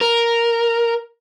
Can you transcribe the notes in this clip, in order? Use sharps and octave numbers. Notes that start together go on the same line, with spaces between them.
A#4